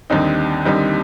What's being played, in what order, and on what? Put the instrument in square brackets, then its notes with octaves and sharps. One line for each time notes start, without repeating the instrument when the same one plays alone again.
[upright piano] D#2 D3 G3 C4 D#4
D#2 D3 G3 C4 D#4